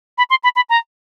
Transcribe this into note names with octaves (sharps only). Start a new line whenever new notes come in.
B5
C6
B5
B5
A#5